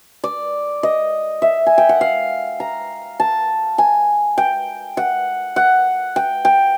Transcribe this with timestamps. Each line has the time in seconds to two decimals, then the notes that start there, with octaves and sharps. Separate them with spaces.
0.24 D5
0.83 D#5
1.42 E5
1.67 G#5
1.78 G5
1.89 F#5
2.01 F5
2.60 A#5
3.20 A5
3.78 G#5
4.38 G5
4.97 F#5
5.56 F#5
6.16 G5
6.45 G5